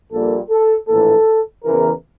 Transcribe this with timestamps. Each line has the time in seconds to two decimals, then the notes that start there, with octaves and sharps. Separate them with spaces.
0.12 A#1 A#2 G3 A#3 A4
0.50 A4
0.88 A#1 A2 E3 A#3 A4
1.64 E2 C#3 E3 A#4